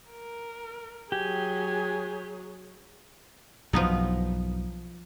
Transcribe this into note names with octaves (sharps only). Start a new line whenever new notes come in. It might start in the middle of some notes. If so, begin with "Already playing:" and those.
A#4
F#3 G4 G#4 G#5
B1 G2 F3 B3 D#4